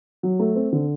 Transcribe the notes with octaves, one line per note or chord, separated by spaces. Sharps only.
F#3
A3
C4
D3